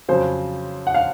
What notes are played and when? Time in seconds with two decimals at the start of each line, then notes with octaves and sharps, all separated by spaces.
0.09 F2 C#3 F#3 C5
0.87 F#5
0.94 F5